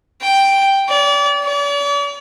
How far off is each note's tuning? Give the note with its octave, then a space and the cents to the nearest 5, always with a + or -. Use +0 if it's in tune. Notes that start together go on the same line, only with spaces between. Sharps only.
G5 +0
D5 -35
D5 -45